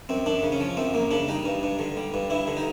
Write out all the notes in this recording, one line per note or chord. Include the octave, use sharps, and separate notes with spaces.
F#2 C4
F#2 D4
C#3
C#4
F3
F#2 C4
F#2 A#3
C#3 D4
G3 D#4
G2
G2
D3
G3
G2
G2 E4
D3
D#4